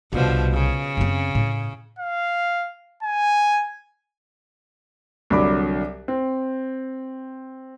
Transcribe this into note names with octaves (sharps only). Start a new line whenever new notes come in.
C2 B2 D3 F3
C#3
F#2 C4
A2
F5
G#5
C2 D3 F#3 B5 D6
C4